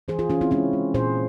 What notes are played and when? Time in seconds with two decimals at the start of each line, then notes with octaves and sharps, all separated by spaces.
0.08 E3 G#4 C5
0.19 F4 G#4
0.30 E3 C#4 F4
0.41 C4 E4
0.51 G#3 C#4 F4
0.73 G#3
0.94 A#2 G#4 C5